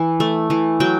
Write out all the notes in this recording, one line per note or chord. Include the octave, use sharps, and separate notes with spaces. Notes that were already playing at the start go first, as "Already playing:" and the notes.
Already playing: E3 E4
A3
E3
F#3 G5